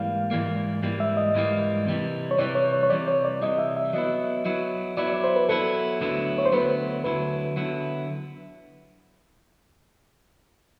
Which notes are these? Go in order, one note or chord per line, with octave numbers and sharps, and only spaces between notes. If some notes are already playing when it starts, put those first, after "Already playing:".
Already playing: G#2 E3 G3 A#3 F5
G#2 E3 G3 A#3
G#2 E3 G3 A#3
E5
D#5
G#2 E3 G3 A#3
C3 E3 G3
C#5
C3 E3 G3 D5
C#5
C#5
C#5
C3 E3 G3 D5
C#5
D5
C3 E3 G3 D#5
E5
E5
F#3 B3 E4 D#5
F#3 B3 E4
F#3 B3 E4 D5
D5
C5
B4
F#3 B3 E4 A4
D2 D3 F#3 B3 E4
C#5
C5
D2 D3 F#3 B3 E4 B4
D2 D3 F#3 B3 E4 B4
D3 F#3 B3 E4